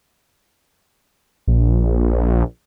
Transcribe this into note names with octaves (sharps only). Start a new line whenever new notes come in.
A#1